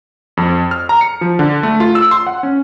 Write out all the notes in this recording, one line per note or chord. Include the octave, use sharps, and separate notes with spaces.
F2
F6
A#5
C#7
F3
D3
A3
F4
E6
C6
F#5
C#4